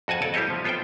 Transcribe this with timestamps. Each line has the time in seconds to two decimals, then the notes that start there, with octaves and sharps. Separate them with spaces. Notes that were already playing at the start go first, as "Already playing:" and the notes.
0.08 F2 F#4 F#5 G#5 A5
0.22 A4 C#5 D5 A5
0.34 G3 E4 G4 C5 C#5 D#5
0.50 F3
0.64 B3 F4 A4 C5 E5 G5